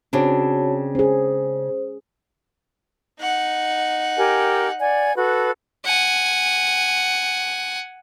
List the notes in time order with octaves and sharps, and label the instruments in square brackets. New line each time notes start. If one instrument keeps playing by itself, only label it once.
[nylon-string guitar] C#3 C4 D4 [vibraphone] F#4 C#5 A5
[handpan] C#4 G#4 [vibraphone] C5
[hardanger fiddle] D#4 F#5
[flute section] G4 A#4 G#5
D5 F#5 G#5
F#4 A4 B4
[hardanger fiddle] F#5 G#5